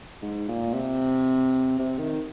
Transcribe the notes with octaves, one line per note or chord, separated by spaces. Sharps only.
G#2
A#2
C3
C3
D#3